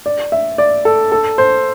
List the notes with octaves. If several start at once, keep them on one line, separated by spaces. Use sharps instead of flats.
D5
E5
D5
A4
A4
C5